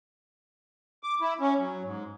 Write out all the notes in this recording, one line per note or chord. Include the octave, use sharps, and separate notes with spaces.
D6
E4
C#4
F#3
G#2